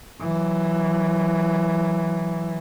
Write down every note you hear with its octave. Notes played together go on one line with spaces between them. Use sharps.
E3 F#3